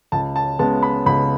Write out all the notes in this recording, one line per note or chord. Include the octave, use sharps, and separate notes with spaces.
C#2 A5
A5
C#3 G#3 B3 A5
B5
C#2 B5